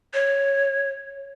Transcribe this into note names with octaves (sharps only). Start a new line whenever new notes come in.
C#5